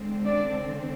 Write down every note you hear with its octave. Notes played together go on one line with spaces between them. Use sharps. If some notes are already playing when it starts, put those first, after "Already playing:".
Already playing: D3 G#3 C4
D4 D5